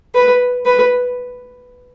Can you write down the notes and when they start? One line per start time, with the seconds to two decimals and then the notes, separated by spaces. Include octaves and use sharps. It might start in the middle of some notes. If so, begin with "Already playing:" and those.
0.15 B4
0.66 B4